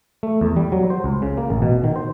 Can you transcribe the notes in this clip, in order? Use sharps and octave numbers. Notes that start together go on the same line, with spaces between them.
A3
E2
G3
F#3
C5
C#2
C#3
A#3
A1
B2
D#3
C5